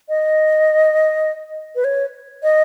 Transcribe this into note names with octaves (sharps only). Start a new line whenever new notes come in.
D#5
B4
C#5
D#5